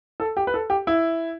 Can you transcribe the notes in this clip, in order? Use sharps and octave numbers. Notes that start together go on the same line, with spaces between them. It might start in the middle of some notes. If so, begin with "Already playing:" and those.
A4
G4
B4
A4
G4
E4